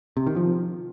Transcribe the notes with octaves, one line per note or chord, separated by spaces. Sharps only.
C3
D#3
F3